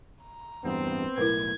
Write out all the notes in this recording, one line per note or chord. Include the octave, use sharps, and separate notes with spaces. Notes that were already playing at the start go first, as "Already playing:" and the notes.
A#5
A1 E2 G2 B3 C4
B1 A2 E4 A#4 B4 G#6